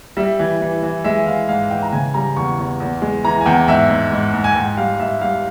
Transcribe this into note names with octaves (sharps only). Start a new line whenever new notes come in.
G3 E5
E3
E3
E3
G#3 E5
E3 F5
G#2 F5
E3 G5
A#5
C#3 G#5
G3 A#5
E2 C#6
E2
E2
G#3
E3 A#5
G#5
E2 G5
G#2 E5
G#2
G#2
G#2
G#5
G#2 G5
G3 F5
G#2 E5
G3 F5